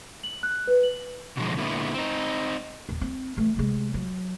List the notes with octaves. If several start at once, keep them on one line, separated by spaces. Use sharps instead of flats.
F#7
F#6
B4
F#7
B2 D3 E3 F3 G#3
A#2 D3 G#3 B3 E4
C4 D#4
D#1
C4
E3 A3
C3 G#3
F#3